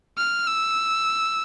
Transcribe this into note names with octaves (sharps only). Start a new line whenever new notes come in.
F6
E6